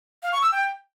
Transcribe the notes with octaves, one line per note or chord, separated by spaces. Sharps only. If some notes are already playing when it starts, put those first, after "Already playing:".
F5
C#6
E6
G5